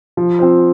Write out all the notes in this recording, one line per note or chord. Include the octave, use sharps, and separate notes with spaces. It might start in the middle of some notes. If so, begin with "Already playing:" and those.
F3
C4 F4 C5